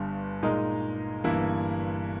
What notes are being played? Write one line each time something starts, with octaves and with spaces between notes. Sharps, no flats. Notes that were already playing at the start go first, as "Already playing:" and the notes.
Already playing: G1 G2 G3
A#2 G#3 D#4 A#4 D#5
G1 G2 E3 A#3 E4